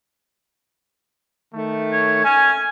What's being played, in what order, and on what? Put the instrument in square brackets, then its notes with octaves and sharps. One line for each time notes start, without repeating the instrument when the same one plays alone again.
[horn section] D#3 A3
[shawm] C#5
[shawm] C#4 [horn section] G#5